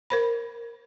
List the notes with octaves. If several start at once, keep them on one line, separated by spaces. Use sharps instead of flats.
A#4 C5 B5